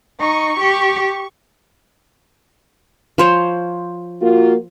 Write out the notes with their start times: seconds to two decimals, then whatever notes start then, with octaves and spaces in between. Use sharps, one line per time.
0.20 D#4 C#6
0.60 G4
3.18 F3 C5 C#5
4.21 A#3 F4 F#4